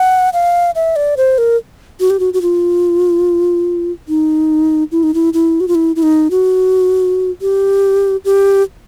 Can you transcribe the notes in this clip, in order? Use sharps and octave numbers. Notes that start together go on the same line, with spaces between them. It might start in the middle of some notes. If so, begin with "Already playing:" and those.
Already playing: F#5
F5
E5
D5
C5
A#4
F#4
G4
F#4
F#4
F4
D#4
E4
D#4
E4
E4
F#4
F4
E4
E4
D#4
F#4
G4
G4